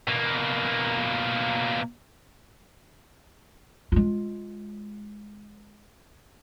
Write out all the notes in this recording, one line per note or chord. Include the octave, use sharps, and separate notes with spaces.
B2 A#3
G#3 F4